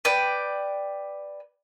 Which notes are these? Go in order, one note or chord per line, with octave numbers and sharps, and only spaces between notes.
B4 D5 G5